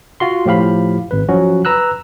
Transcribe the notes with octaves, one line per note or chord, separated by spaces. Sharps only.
F4 F#4 C6
A2 F3 G4 F5 B5
G#1 B4
F3 F#3 C#4 F#4
B4 A#5 E6 F#6